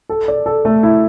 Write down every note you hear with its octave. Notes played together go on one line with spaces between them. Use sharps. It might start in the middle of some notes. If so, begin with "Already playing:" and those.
A4
D5
A4
A3
E4